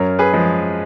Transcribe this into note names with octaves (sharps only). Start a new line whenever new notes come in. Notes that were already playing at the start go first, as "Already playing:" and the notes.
Already playing: F#2 A#4 C#5
G#4 B4
F3 G#3